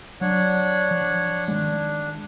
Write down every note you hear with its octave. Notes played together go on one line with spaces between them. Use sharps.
F#3 D4 C#5 F#5
F3
D#3 G#3 D4